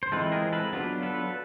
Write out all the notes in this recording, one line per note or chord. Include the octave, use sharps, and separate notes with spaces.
C5
E3 G#3 C4 F4 A4 B4
G#4 A#4
A4 B4
F#3 B3 D4 F4
A4 B4